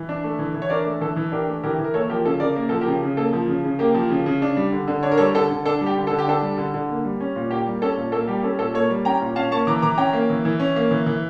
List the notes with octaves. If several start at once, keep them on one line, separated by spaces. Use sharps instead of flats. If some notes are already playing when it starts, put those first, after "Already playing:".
Already playing: E3
D4
A3
E3
E3
C#5
D4 A#4 D5
A3
E3 A4
E3
D4 G4 A#4
A3
E3 G4 A#4
E3
A#4
A#3 A4 C#5
F3 G4 A#4
C#3 A4
C#3 A#4 D5
A#3 A#4
F3 A4
G4 A#4
C#3
C#3
A#3 A4
F3
C#3
C#3
A#3 G4 A#4
F3
C#3
C#3
D4
G3
D3
D3
D4 C#5
A#4
G3 A4 C#5
D3 A4
D3
D4 A4
G3
G4
D3
D3 A4
G4
D4 A4
G3
D3
D3
A#3
G3
C#4
A#2
A#3 G4 A#4
G3
C#4 A4
A#2
A#3 A4
G3 G4
C#4 A4
A#2 A4
A#3 A4 C#5
G3
C#4 G5 A#5
A#2
C#4 F5 A5
A#3 A5 C#6
E3 A#5 D6
E3 A#5 D6
C#4 G5 A#5
A#3
E3
E3
C#4
A#3
E3
E3